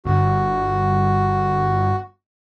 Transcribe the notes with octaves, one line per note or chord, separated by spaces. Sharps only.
G1 F#4